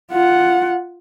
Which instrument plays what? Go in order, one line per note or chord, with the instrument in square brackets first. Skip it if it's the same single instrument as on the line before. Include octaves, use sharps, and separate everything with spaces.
[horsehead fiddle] F4 F#5